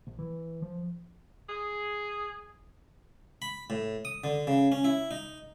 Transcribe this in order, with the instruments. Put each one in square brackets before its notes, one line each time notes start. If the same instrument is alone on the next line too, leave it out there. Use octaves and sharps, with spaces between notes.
[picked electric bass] A#1
E3
F3
[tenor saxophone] G#4
[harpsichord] B5
A2
D#6
D3
C#3
C#4
E4
D#4